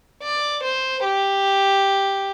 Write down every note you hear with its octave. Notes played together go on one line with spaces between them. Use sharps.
D5
C5
G4